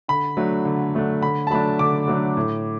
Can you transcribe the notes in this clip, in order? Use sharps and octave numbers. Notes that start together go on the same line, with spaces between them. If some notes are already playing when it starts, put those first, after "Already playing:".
D3 B5
F#3 A3 D4
D3
F#3 A3 D4
D3 B5
A5
F#3 A3 D4 B5
D3 D6
F#3 A3 D4
A2